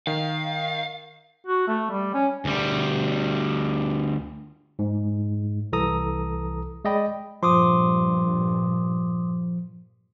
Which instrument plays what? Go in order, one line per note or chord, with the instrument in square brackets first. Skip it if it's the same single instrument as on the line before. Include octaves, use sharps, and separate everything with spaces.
[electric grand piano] D#3 [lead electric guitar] F5
[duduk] F#4
A3
G3
C#4
[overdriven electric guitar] D2 G3
[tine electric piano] G#2
C2 E3 A4 A#5 D#6
G#3 D5 D#5 G5 B5
[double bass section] G2 A#2 [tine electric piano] F3 [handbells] C6 D6 D#6